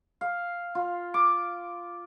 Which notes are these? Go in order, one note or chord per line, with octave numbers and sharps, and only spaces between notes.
F5
F4
D6